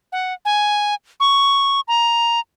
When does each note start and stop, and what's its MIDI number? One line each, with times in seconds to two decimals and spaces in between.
0.12 0.33 78
0.45 0.94 80
1.20 1.80 85
1.88 2.40 82